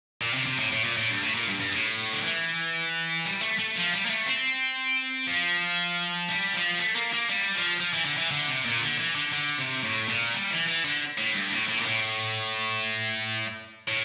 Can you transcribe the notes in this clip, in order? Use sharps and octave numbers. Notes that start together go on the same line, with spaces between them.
A#2
C3
C3
A2
A2
A#2
A2
G2
A2
A#2
G2
G2
A2
D3
E3
G3
A3
A3
F3
G3
A#3
A3
C4
F3
G3
F3
A3
A#3
A#3
G3
F3
F3
E3
D3
E3
D3
C3
A#2
D3
E3
D3
D3
C3
A2
A#2
G3
E3
E3
D3
A2
G2
A2
A2
A#2
A2
A2